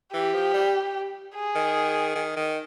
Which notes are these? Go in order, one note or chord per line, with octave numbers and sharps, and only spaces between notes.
E3 G4
F3
G3
G#4
D#3
D#3
D#3